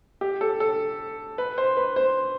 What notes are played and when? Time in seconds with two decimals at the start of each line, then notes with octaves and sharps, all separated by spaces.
0.21 G4
0.41 A4
0.60 A4
1.38 B4
1.58 C5
1.77 B4
1.96 C5